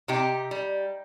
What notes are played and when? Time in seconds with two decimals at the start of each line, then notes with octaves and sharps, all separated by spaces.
0.08 C3 D#4 G4
0.51 G3